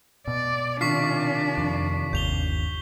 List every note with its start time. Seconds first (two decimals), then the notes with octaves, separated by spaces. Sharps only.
0.27 B2 D5
0.81 C3 D#3 D4 F4 C#6 B6 C7
1.58 F2
2.13 G1 D#2 G6 F7 G7